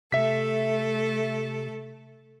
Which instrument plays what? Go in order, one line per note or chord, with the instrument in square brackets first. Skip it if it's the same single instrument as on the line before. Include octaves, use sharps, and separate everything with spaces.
[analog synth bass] C3 [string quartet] A3 A4 [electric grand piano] E5 B6